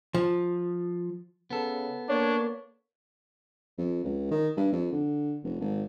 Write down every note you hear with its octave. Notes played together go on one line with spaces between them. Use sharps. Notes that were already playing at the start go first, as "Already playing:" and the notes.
F3
C#3 B3 A4
A#3 D4 C#5
F2
C#2
D#3
G2
F2
D3
F1
G#1